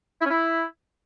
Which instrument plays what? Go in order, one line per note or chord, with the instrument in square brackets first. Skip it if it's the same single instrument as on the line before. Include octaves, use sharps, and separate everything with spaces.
[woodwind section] E4
C#4
E4